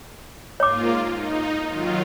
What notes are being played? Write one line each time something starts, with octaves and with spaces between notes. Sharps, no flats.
G#2 A#3 F4 C#5 D6
D#4
D#3 F#3 F4